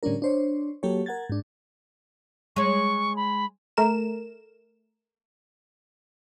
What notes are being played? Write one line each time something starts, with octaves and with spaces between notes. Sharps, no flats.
A2 D3 G3 C#4 D4 A#4
D4 C5 C#5
F#3 A#3 G4 A4 C#5
A#4 F#5 G#6 A6
G#2 D4
G#3 C#5 C#6
B5
A3 A#4 E7